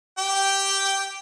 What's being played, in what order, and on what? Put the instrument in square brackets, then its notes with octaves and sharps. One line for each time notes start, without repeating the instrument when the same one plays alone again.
[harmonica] G4 G5